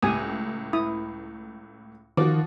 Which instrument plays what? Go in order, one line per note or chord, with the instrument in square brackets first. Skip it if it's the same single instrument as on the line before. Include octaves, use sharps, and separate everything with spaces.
[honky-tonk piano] C#2 A2 [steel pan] G4 G#5 D#6
[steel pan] E4 D#6
[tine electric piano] D#3 [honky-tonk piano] F3 F#4 [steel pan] D6